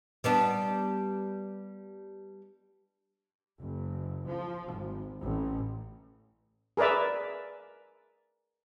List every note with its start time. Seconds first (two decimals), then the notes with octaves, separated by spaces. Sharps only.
0.24 G3 B3 D4
3.59 F#1
4.25 F3
4.73 G#1
5.20 A1
6.77 G#4 A#4 B4 D5 E5